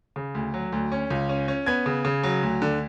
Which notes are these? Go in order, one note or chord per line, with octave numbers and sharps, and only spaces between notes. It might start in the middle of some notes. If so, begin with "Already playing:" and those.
C#3
D2
F#3
D2
C#4
C#2
C#4
C#4
B3 G#6
C#3
C#3
F#3
D2
D3